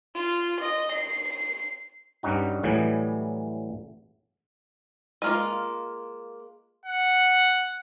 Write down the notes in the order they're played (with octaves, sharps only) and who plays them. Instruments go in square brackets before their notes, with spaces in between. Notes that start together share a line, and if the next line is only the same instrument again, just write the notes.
[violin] F4
D#5
C7
C7
[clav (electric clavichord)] G2 G3 C#4 D#4 F#4
A2 E3 F#3 G3 G#4
[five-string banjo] G#3 A#3 F4 [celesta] C6 F6 D#7
[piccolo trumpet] F#5